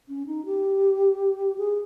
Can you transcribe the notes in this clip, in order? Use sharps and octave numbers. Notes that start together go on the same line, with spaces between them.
C#4
D#4
G4
G#4